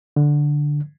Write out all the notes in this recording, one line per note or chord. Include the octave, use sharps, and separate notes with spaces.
D3